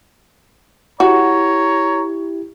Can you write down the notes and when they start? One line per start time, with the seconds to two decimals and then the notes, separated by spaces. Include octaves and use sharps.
1.00 E4 F#4 G4 C#5 A#5